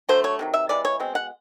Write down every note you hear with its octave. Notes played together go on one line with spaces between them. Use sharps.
D3 F#3 A3 C5
C#5
C3 D#3 F#3
E5
C3 E3 G#3 D5
C#5
B2 G#3 C4
F#5